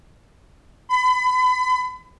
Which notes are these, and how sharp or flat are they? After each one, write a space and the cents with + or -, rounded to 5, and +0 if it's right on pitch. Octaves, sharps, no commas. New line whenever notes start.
B5 +35